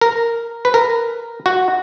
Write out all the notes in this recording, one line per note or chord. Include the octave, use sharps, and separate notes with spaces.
A#4
B4
A#4
F#4